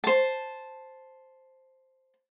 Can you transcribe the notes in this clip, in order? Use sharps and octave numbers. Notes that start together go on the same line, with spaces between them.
C5 A5